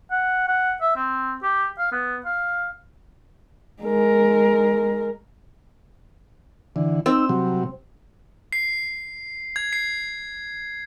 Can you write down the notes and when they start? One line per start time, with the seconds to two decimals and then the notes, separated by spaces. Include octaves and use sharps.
0.11 F#5
0.47 F#5
0.81 E5
0.96 C4
1.43 G4
1.78 F5
1.92 B3
2.25 F5
3.82 G#3 A#4
6.76 D3 E3
7.06 C4 D#4 E6
7.29 C3 F#3 G3
8.53 C7
9.56 G#6
9.73 C7